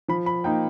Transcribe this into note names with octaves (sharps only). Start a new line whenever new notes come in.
F3 B5
B5
A#3 D#4 G5